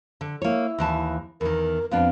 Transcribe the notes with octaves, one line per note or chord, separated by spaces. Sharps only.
D3
A#3 E4 C#5
D#2 E3 A5
E2 D#3 A#4
F2 B3 D4 F5